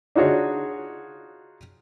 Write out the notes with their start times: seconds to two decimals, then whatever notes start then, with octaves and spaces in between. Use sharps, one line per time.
0.16 D4 D#4 F4 F#4 G#4 C#5